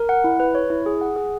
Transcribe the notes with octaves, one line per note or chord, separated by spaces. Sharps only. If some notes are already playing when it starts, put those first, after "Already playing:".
Already playing: A#4
F#5
E4
B4
C#5
E4
G#4
F#5
G#4